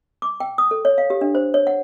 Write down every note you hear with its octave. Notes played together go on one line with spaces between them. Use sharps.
D6
G5
D#6
A4
C#5
F5
G4
D4
C5
C#5
F#5